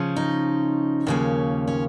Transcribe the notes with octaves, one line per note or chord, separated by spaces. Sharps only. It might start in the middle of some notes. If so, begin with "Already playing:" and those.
Already playing: C#3 F3 C#4
D#4
D#2 C#3 F3 A#3 C#4
C#4